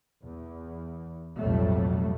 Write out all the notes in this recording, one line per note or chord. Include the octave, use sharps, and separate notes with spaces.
E2
B1 F2 A2 F#3 G3 A3